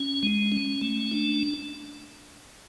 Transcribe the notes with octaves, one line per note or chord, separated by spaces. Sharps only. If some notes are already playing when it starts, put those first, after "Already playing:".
Already playing: C#4
G#3
C#4
A3
D4